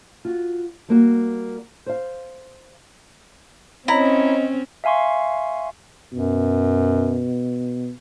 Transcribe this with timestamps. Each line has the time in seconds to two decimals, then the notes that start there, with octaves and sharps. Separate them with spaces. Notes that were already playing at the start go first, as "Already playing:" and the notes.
0.25 F4 F#4
0.89 G3 A#3 F#4
1.86 C5 F5
3.88 C4 C#4 E4 C#5 D#5 A#5
4.84 E5 F5 G#5 C6 C#6
6.12 F#2 B2